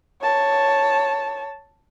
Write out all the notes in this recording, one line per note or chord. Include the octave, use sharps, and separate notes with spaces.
C#5 A5